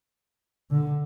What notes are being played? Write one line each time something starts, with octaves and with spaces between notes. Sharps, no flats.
D3